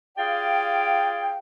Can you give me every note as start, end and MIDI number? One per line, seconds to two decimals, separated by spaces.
0.17 1.38 65
0.17 1.38 67
0.17 1.38 68
0.17 1.38 74
0.17 1.38 77
0.17 1.38 79